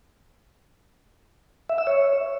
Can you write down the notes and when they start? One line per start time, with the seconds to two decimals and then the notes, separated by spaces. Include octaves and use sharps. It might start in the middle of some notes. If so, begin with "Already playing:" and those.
1.69 E5
1.78 E6
1.87 C#5